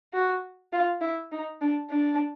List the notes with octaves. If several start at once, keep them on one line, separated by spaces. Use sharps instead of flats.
F#4
F4
E4
D#4
D4
D4